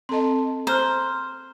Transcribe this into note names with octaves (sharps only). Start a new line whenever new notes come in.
C4 A4 D#5 A5 C6
C5 A#5 F6 F#6